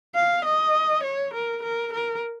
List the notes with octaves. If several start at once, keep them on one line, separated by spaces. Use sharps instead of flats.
F5
D#5
C#5
A#4
A#4
A#4